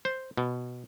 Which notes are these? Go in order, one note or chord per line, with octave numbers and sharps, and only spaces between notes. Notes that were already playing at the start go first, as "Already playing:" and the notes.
C5
B2